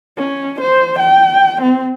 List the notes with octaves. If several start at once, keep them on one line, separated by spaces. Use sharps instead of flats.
C#4
C5
G5
C4